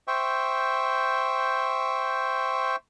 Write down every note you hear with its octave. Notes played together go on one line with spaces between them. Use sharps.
C5 E5 G5 C#6